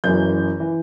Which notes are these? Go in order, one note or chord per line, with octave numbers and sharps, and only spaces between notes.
F#1 F#2 E3 G6
E3